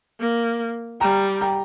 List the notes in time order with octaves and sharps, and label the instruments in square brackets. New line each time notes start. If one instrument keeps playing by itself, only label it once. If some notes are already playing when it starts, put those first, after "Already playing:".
[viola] A#3
[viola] G3 [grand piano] G5 A#5
[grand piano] G5 A#5